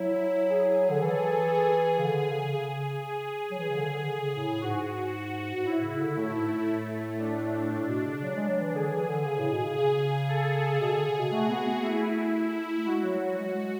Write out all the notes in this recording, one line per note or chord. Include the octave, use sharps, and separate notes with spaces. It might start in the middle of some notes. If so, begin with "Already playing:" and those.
Already playing: F#3 E4
G#4
D3
E3 A4
G#4
C#3
D3
C#3
C#3
G#4
F#3
E3 G#4
C#3
D3
D3
C#3
A2
G#2 F#4
G#2
A2 E4
C#3
D3
A2 A3
G#2
A2
D4
A2
B2
C#3
F#3
G#3
F#3
E3
D3 G#4
E3
D3
C#3
A2
B2
C#3
C#3 G#4
A4
C#3
B2 G#4
D3
C#3
B2
A3 F#4
B3
B3
A3 E4
A3
G#3 F#4
F#3
F#3
G#3
F#3
G#3